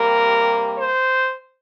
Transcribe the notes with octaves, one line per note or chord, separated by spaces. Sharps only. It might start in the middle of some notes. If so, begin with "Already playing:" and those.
Already playing: C3 G3 A#3 A#4
C5